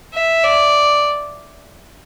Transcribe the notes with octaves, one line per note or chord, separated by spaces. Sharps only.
E5
D5